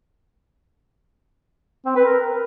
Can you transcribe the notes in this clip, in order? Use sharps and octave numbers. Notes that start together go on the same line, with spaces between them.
C4
B4
A#4